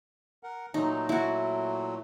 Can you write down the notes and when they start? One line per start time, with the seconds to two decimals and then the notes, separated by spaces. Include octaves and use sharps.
0.43 A#4 F#5
0.74 A#2 F#3 A3 D#4
1.09 E4 F#4